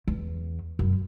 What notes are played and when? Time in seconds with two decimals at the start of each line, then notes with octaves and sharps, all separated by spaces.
0.08 E2
0.79 F#2